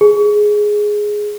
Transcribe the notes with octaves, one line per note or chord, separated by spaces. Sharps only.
G#4